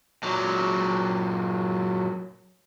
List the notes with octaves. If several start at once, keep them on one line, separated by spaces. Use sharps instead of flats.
A#2 F#3